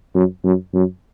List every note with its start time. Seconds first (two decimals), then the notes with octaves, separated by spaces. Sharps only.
0.14 F#2
0.44 F#2
0.74 F#2